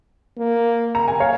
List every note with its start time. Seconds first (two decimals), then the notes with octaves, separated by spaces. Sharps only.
0.38 A#3
0.95 A#5
1.08 G#5
1.20 C#5 F5